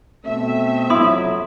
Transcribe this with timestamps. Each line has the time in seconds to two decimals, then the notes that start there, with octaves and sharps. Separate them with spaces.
0.25 B2 A3 C4 E5
0.90 F2 F#3 A#3 E4 C6 D#6